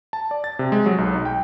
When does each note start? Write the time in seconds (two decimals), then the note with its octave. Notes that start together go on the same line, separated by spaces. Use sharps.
0.13 A5
0.31 D5
0.44 A6
0.59 C3
0.72 G#3
0.86 F#3
0.98 B1
1.14 D#4
1.25 G5